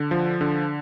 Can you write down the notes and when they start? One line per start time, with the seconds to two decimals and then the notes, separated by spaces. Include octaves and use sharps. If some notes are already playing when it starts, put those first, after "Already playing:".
Already playing: D3
0.11 F3
0.41 D3